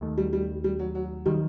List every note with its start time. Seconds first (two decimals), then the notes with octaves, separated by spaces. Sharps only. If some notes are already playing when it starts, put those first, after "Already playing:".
0.01 D#2 D#3 A3
0.18 G3
0.33 G3
0.64 G3
0.79 F#3
0.95 F#3
1.26 D#3 F#3 G3